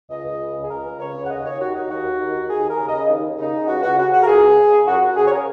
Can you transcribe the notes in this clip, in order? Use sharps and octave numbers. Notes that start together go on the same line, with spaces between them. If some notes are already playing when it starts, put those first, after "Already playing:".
C#2 D#5
C#2
C#3
C#3
G#4
C#2 A#4
C#2
C#3 C#5
C#3
F#5
D#2 D#5
D#2 C#5
D#3 F#4
D#3 D#4
D#2 F#4
D#2
D#3
D#3
D#2 G#4
D#2
A#4
C#3
C#3 D#5
D#2
D#2
C#3 D#4
C#3
C#2 F#4
C#2 F#4
C#3 F#4
C#3 F#4
A#4
C#2 G#4
C#2
C#3
C#3
F#2 F#4
F#2 F#4
C#3 G#4
C#5
C#3 A#4